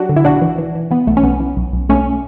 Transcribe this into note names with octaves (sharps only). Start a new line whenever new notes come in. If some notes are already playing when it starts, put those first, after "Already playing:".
Already playing: F#3 D4 F#4 G4
D3
E4
B1 D4 F#4
E3
E3
E3
E3 B3
B1 A3
C#4
B1 B3
E3
B1
B1
B1 A3 C#4